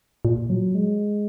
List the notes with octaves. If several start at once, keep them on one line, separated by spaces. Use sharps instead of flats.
A#2
F#3
G#3